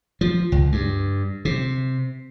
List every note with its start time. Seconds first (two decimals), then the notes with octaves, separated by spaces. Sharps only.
0.21 F3
0.52 C#2
0.72 G2
1.45 C3